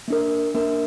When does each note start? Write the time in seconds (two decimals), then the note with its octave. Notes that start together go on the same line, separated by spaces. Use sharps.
0.08 A#3 D4 A#4
0.55 A#3 D4 A#4